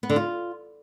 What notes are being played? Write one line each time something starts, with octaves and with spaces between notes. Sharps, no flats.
B3
D3
F4